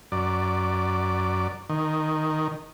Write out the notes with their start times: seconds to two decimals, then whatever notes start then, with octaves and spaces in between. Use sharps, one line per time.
0.12 F#2 D5
1.69 D#3